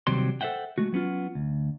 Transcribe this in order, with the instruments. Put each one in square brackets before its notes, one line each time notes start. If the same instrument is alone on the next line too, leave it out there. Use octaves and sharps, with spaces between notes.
[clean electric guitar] D#2 C3 F#3 G3 C4 C6
A4 C5 E5 F#5 G5
G#3 A3 F#4
F#3 B3 C#4 F4
D2